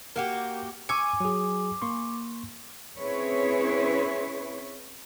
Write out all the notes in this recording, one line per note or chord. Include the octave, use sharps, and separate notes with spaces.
A#3 F#4 G4 A#4
G#5 C#6 D6 E6 C#7
F#3 G#4
A#3 C6 C#6
C4 C#4 E4 G#4 B4 C#5